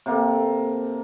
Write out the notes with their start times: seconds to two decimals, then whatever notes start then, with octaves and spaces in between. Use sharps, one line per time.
0.06 C3 A#3 A4